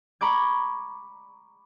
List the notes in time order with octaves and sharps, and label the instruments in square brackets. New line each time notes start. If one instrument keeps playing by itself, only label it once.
[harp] A#5 B5 C#6 D6 G#6